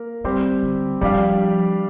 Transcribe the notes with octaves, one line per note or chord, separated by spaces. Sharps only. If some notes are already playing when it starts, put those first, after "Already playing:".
Already playing: A#3 A#4
D3 G3 C4 G4
D3
F3 G3 D4 G4 D5 F5